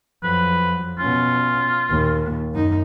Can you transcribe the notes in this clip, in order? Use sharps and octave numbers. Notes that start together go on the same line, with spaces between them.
F2 F#3 B4
B2 C#4 F4
D#2 A#2
F#2 D#4